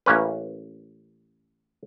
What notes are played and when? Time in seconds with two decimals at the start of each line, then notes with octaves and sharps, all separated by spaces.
0.06 A1 A#3 C#4 B4